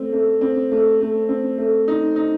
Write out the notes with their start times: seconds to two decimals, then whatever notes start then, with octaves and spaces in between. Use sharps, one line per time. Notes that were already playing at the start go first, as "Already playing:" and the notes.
Already playing: A3 C4
0.13 A3
0.41 C4
0.72 A3
1.01 A3
1.29 C4
1.58 A3
1.88 D#4
2.16 D#4